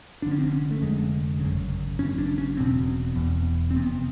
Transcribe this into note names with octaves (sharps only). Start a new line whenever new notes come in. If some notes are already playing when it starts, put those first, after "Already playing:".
F1 F2 D3 D4
C#4
C4
C#4
A3
F1 F2 D3 G#3
G#1 F#2 C#3
G#1 F#2 C#3 C#4
D4
C#4
E1 E2 B2 C4
E1 E2 B2
C4
F1 F2 C3 B3